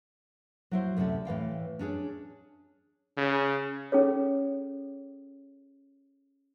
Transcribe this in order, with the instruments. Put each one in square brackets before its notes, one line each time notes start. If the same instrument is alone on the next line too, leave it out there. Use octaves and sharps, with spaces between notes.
[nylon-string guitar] F#3 E4 C5
D2 C3 C#4 A4 D5
A2 E3 F5 G5
C#4 D4 G#4 C#5
[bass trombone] C#3
[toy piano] C#4 G#4 A4 C#5